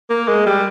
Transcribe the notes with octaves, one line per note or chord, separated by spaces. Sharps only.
A#3
G#3
G3